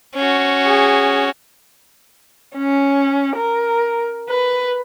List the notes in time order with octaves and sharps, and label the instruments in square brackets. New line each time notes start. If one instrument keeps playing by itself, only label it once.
[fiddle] C#4 F#4
[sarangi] G#4
C#4
A#4
B4